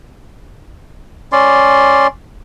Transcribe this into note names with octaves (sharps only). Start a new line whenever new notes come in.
C#4 D5 C6